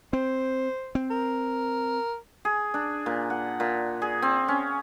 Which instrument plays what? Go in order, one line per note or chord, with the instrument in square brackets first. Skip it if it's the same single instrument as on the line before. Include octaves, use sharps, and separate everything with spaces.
[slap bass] C4 [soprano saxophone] C5
[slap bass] C4
[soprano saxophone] A#4
[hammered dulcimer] G#4
D4
A#2
F#5
A#2
G#4
C4
C#4